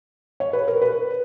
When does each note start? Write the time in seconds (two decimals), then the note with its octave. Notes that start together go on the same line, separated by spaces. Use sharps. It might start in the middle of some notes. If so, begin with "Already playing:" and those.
0.40 C#5
0.53 B4
0.68 A#4
0.82 B4